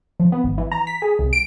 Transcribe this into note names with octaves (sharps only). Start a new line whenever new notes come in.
F3
B3
G#1
E3
A#5
B6
G#4
C2
D7